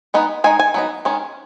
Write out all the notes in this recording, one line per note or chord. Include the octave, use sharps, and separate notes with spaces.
G#3 B3 D#4
G#3 D#4 G#5
G#5
F#3 B3 D#4
D#3 G#3 C#4